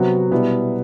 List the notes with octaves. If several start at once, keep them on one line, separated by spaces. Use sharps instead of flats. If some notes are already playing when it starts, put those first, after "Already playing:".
Already playing: C3 F#3 B3 F#4
B2 G3 B3 E4